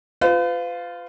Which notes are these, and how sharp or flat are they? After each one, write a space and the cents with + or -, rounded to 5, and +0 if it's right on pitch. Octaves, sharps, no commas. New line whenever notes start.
F4 +0 B4 +45